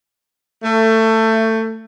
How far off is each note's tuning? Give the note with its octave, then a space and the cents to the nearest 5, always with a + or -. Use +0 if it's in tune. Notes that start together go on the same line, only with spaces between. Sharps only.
A3 +20